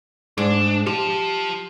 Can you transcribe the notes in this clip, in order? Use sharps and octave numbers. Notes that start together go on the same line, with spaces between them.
G#2 D4
F4 G4 A5